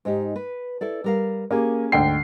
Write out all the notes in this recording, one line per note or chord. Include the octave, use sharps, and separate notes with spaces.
G#2 D#4 G4
B4
E4 A4 D5
G3 A#4 F5
A#3 C#4 G4 G#4
D2 G#2 G5 C7